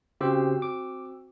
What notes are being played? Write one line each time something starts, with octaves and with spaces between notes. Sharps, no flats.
C#3 C4 F#4 G4 C5 E6
D6